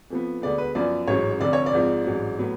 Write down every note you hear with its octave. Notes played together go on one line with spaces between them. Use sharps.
F2 F3 B3
D2 D3 G#3 B3 D5
B4
F#2 F3 B3 D5
A1 G#2 F#3 C#4 C#5
F1 F2 D3 D5
C#5
D5
G#1 G#2 F3
A1 G#2 F#3
A2 F#3 B3